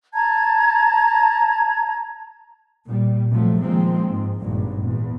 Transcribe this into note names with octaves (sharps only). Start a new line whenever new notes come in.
A5 A#5 G#6
A#2 G3
C3 F3 F#3 A3
A#2 D#3 F3 G#3 A#3 C4
G#2
G#1 G2 A#2
E2